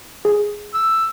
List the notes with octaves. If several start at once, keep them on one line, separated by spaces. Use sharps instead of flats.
G#4
E6